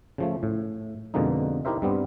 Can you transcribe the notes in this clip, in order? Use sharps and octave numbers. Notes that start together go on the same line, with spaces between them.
C#3 F3 A3
A2
F2 B2 D3 G#3 A#3 D#4
D#4 E4 G4 A#4 C5 E5
G2 G3 B3 C4